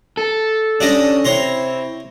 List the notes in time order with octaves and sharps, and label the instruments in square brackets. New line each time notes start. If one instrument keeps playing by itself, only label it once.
[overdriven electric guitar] A4
[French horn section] C#4 [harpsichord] D4 G4 D#5
[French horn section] C3 C4 E4 [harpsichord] C#5 A#5 C6